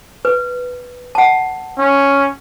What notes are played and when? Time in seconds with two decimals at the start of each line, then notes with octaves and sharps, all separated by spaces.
0.25 B4
1.15 F#5 A5
1.78 C#4